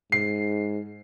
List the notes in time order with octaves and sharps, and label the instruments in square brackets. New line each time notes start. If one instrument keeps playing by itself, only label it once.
[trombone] G#2 [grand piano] C7